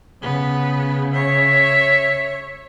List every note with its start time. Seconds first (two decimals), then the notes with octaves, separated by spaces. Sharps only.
0.22 C#3 B3
1.14 C#5 E5